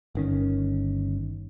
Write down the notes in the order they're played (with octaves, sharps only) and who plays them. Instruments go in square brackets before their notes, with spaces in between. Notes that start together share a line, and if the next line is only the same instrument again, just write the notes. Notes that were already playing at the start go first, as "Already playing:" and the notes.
[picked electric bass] G1 D#3 C#4